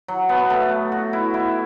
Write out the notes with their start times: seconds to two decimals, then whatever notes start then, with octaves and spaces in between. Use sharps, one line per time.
0.08 F#3
0.29 B3
0.50 A3
0.92 F#4
1.13 E4
1.34 E4